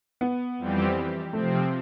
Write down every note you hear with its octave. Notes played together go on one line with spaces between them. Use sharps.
B3
F2 E3 G3 C4 G4
C3 F3 A3 C4